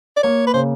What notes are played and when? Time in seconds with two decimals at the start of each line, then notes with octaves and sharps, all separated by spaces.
0.17 D5
0.23 A#3 C#5
0.47 B4
0.53 C#3 C5